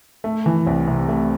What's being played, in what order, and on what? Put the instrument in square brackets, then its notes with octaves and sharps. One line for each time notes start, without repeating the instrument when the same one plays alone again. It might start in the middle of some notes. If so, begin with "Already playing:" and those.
[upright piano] A3
E3
C2
C3
A3